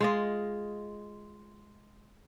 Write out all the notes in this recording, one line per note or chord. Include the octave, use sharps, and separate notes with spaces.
G#3 F4 D#5